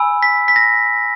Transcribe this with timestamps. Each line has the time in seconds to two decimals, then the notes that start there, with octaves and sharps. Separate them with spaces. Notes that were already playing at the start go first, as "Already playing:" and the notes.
Already playing: G#5 B5 E6
0.23 B6
0.48 B6
0.56 A#6